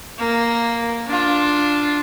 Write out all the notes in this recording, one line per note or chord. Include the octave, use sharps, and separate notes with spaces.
A#3
D4 F4